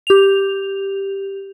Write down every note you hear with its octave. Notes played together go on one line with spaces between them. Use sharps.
G4 F7